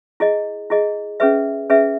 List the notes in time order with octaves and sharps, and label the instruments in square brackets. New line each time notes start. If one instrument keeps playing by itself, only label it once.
[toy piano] E4 G#4 D#5
E4 G#4 D#5
C#4 G#4 B4 E5
C#4 G#4 B4 E5